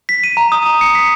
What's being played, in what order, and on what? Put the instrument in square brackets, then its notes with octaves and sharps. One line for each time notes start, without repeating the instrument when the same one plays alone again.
[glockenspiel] B6
D#7
A#5
D#6
A#5
C#7
B6